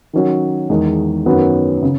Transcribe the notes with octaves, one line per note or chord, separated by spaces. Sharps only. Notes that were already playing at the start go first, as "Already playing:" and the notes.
D#3 F#3 C#4
E2 D#3 G#3
F#2 D#3 F#3 B3
C#3